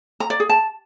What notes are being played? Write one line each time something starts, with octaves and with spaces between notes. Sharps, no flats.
A#5
D5
G#4
A5